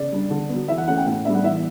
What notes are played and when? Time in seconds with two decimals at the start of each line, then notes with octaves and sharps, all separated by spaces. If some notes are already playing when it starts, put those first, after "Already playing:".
Already playing: C#3 D5
0.12 G3 D4
0.30 D3
0.49 B3
0.54 F#3
0.68 E3 E5
0.78 F#5
0.88 A3 C#4 F#5
0.97 G5
1.06 A2 F#5
1.25 G3 B3 D4 E5
1.34 F#5
1.43 E3 E5